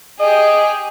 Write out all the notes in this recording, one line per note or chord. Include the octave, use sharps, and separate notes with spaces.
G4 G#4 D#5